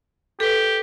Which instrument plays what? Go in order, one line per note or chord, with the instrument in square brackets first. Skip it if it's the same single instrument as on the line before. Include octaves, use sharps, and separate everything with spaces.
[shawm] G4 [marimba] A4 B4